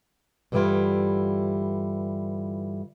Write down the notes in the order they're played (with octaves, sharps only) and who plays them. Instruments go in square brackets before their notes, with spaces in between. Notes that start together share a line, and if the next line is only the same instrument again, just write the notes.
[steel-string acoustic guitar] G2 D3 E3 G3 E4 F4